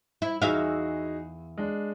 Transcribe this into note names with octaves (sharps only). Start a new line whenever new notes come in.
E4
E2 D#4 F#4 G#4 E5 F5
G#3 D4